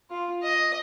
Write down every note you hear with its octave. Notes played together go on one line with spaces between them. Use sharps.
F4
D#5